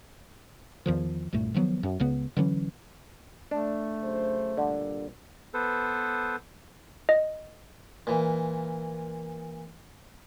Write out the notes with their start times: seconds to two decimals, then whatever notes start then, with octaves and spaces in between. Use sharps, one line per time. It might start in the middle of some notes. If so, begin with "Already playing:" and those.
0.86 E2 D#3 F3
1.33 C2 G2 A#2 A3
1.54 D#3 F3 F#3 B3
1.83 F#2
2.00 C#2 C#3 B3
2.37 D3 E3 F#3 C#4
3.51 A3 D4
4.03 F#2 C#3 C5
4.57 G2 A#2 D3
5.54 B3 A4 B4 C5
7.09 D#5
8.07 A#2 E3